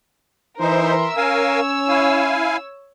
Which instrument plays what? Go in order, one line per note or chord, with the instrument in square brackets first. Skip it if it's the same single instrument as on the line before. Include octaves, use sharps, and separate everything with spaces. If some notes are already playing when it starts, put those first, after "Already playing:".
[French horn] E3 [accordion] D#4 C5 [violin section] A#4 E5 C6
[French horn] C#4 [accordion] A#4 F5 G#5 [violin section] C#5 E6
[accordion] E4 F5 G#5